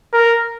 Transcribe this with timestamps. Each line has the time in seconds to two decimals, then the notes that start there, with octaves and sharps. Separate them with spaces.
0.13 A#4